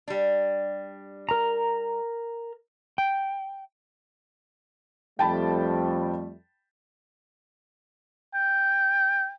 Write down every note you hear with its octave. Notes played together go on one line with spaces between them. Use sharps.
G3 D4
A#4 A#5
G5
F2 G3 A3 G5 A5 B5
G5